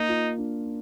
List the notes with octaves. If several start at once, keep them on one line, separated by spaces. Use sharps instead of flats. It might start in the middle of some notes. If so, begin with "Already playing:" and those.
Already playing: A#3 D#4
F4
D4